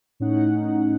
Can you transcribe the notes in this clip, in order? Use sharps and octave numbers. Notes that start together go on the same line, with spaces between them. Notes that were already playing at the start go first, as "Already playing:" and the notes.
A2 C#4 D#4 F#5